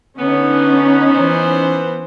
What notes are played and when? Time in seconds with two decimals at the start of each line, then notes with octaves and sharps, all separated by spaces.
0.19 D3 B3 C#4 D#4
1.12 E3 C5